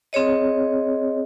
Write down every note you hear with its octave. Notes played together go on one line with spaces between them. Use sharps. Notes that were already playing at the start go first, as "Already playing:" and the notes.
C4 G#4 C#5 D#5